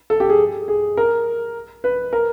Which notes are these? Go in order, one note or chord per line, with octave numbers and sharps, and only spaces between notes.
A4
G4
G#4
G#4
A#4
B4
A#4